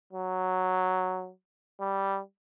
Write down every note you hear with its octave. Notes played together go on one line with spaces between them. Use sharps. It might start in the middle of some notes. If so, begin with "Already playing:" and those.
F#3
G3